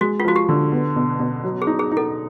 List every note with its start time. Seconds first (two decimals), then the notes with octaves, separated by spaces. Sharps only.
0.01 G#3 F#4
0.20 F4
0.25 F3 F#4
0.36 G4
0.49 D3
0.72 B3
0.96 B2
1.19 B2
1.44 F#3
1.62 G#4
1.67 D#4
1.79 G#4
1.91 D#4
1.97 A4